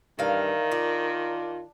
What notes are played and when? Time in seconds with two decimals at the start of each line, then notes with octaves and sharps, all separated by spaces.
0.19 G2 D#3 E3 A#4 D5 F5 A#5
0.71 D4 F4